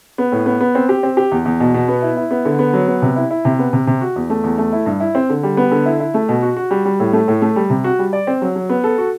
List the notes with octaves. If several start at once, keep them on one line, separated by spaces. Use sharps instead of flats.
B3
A2
B3
B3
C4
G4
C4
G4
E2
E2
B2
B2
B3
E4
E4
B3
D3
B3
F#3
B3
C3
E4
E4
C3
B3
C3
C3
F#4
E2
A3
E2
A3
E4
G2
E4
C4
D3
G3
B3
D3
E4
E4
A3
B2
F#4
F#4
G3
G3
A2
A3
A2
A3
G3
C3
F#4
G3
D5
C4
F#3
F#3
B3
A4
F#4